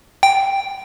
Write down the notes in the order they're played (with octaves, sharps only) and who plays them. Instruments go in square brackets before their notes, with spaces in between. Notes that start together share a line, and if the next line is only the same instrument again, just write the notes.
[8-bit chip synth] G5